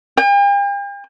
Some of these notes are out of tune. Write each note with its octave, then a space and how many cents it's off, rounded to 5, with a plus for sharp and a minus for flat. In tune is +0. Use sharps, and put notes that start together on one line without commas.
G5 +45